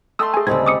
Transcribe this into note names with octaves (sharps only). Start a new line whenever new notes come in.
A3 A5 C6 D#6 E6
G#4 G#5
D2 C#3 G3 G#3 C4 G#6
D6 D#6 C#7